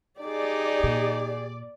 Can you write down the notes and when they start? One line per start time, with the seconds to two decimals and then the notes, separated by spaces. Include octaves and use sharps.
0.21 D#4 G4 G#4 D5
0.84 A#2